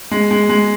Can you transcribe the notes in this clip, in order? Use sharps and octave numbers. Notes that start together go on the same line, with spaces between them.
G#3
G#3
G#3